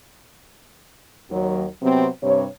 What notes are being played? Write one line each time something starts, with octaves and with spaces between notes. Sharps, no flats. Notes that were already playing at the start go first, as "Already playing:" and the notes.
D#2 F#3
C3 F#3 B3 C4
G2 C3 C#5